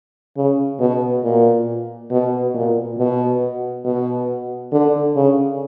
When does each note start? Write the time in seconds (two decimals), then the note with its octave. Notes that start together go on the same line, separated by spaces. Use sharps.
0.37 C#3
0.80 B2
1.24 A#2
2.11 B2
2.54 A#2
2.98 B2
3.85 B2
4.72 D3
5.16 C#3